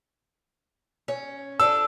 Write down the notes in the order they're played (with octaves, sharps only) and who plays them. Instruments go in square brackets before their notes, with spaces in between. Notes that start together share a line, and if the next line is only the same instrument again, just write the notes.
[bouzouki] C#4
[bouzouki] F3 D4 A4 [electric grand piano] E6